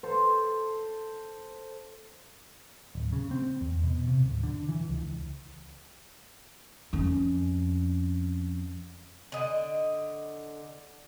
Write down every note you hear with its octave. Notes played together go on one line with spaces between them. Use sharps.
A4 C5
D1
C#3
C4
E2
B2
C3
D1
D3
E3
C#2
F2 C#4
D3 D#5